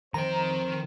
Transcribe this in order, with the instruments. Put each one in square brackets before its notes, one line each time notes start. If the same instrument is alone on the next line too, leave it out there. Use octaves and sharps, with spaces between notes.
[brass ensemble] F2 C4 C5 [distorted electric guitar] D#3 G5 [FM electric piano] A#5